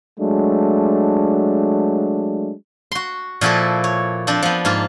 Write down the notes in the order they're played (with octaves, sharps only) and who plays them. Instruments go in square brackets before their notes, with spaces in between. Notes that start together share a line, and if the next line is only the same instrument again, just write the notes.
[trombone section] F#3 G#3 A3 D4
[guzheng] F#4 C6
A#2 F3 E4 F#4 A4
C#5
F3 C4 D4
F3 B3
G#2 A#3 F4